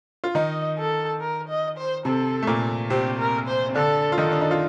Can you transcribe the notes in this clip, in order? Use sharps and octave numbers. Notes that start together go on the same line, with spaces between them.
F4
D#3 D#4 D#5
A4
A#4
D#5
C5
C3 C4 A4
A3
A#2 A#3
C3 C4 G4
A#4
C5
C4
D3 D4 A4
F4
D#3 D#4 A4
D4
D#4
F4